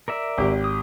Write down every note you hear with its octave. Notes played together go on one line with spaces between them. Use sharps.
A#4 D5 E5
G#1 G4
D#6